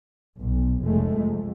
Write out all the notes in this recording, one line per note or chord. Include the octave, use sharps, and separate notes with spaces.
B1
F1 G#3 A3
F2